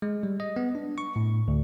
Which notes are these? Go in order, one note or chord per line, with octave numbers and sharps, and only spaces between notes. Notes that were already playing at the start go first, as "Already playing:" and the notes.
G#3
G3
D#5
B3
D4
C#6
A2
D2